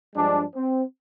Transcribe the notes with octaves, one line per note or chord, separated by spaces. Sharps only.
G2 F3 G#3 D4
C4